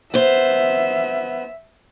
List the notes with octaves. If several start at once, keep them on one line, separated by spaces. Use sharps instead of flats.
B3 C5 E5